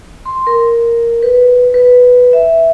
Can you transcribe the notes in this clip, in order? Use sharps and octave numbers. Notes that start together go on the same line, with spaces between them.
C6
A#4
B4
B4
E5